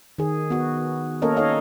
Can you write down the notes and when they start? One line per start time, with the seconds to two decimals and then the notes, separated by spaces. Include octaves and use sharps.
0.18 D#3 G#4
0.50 B3 F#4
1.22 A#3 C#4 A4 A#4 C#5 D#5
1.37 D#4 A4 C#5 D#5 F5